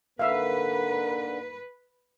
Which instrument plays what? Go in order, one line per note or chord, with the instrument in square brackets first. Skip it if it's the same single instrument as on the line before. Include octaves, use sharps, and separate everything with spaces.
[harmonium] D3 [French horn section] A#3 D#4 A#4 [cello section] B4 [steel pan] E5 F5